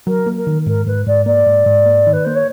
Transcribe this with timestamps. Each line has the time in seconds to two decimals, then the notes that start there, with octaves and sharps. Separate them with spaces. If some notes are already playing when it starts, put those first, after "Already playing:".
0.07 F#3 A#4
0.26 A#3
0.36 A#4
0.47 D#3
0.66 G#2 A#4
0.86 G#2 B4
1.06 G#2 D5
1.26 A#3 D5
1.46 G#2
1.66 G#2
1.86 A#3
2.07 D#3
2.12 B4
2.24 A#3 C5
2.35 C#5